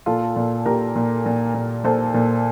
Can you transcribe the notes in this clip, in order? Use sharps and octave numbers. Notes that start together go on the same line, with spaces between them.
A#2 F4 A4
A#2
A#2 G4 A#4
A#2
A#2
A#2
A#2 A4 C5
A#2